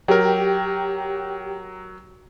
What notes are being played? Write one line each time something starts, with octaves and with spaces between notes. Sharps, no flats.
F#3 G4 A#4